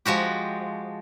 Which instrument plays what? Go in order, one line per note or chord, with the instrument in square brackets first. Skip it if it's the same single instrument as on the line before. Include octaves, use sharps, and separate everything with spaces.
[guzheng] F3 G#3 F#4 G4